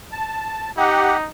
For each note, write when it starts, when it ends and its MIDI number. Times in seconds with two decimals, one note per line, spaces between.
0.12 0.71 81
0.77 1.28 63
0.77 1.17 67
0.77 1.17 78